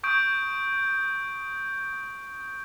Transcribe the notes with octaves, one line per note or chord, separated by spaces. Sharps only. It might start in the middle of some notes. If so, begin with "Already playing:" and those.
C#6 D#6 G6 D7